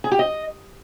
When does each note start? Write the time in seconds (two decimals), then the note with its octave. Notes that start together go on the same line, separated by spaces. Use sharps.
0.04 G#4
0.12 G4
0.19 D#5